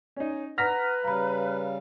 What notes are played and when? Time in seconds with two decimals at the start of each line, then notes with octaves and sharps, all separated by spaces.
0.16 C#4 D#4
0.58 B4 F#5 A#5 F6 A#6 B6
1.05 C#3 G3 F5 A#5 B5